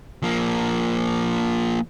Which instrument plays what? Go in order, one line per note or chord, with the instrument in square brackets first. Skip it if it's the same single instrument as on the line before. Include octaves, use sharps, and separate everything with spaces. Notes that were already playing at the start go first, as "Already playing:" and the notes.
[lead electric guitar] F3 A#3